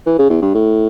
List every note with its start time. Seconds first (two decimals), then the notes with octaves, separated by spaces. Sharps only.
0.06 E3
0.18 C#3
0.30 E2
0.42 G2
0.55 A2